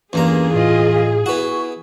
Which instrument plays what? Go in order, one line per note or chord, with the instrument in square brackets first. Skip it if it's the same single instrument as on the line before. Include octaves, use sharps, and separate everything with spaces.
[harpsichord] E2 G2 A#5 [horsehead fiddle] A#3 [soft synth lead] C#4 [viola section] G#4
[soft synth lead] A2 [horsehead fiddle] F4 D#5
[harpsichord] B3 F#4 [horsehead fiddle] E4 [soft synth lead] C#6